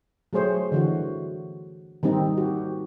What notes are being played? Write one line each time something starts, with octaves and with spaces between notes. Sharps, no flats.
F#3 A3 G#4 C5 C#5
D3 E3 F#4
D#3 G3 C4 D#4
F#4 G4